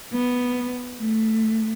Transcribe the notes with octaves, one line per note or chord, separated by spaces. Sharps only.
B3
A3